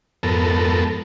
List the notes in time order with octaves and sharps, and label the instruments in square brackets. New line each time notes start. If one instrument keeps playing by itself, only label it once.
[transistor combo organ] F2 G#2 B3 A4 A#4